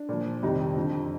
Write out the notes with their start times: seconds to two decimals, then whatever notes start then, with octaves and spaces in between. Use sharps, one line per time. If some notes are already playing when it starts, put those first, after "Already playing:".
Already playing: D4
0.09 A#2 F3
0.42 F2 C3 D#3 G3 D#4
0.77 F2 D3 F3